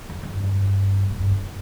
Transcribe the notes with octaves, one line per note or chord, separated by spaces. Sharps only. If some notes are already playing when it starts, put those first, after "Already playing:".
F2
G2
A2
G2
F2